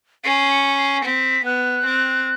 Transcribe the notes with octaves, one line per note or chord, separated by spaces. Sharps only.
C#4 C7
C#7
C7
C4 B6
B3 F#6
C4